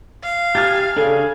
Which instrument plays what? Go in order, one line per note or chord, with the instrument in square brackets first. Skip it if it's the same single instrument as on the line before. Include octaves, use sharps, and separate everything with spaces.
[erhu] F5
[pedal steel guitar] G4 G#5 [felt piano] F6 G#6 A6
[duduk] C#3 [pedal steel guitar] D4 G#5 [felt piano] A4